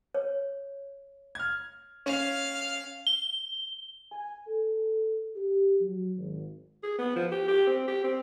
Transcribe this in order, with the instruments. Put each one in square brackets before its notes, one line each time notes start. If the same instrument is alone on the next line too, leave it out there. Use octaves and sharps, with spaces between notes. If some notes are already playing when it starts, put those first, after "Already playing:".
[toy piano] C#5
[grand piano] F6 G#6
[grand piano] C#4 [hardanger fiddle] F5
[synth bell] G7
[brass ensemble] G#5
A4
G4
F#3
G#1
[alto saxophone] G#4
B3
F3
G4
G4
C4
G4
C4